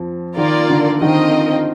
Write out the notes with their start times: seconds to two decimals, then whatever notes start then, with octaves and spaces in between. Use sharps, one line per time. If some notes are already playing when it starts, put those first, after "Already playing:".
Already playing: F2 F3
0.37 D#3 A#3 F4 A#4 D5
0.70 D3
1.02 D#3 C4 F4 A#4 D#5 G5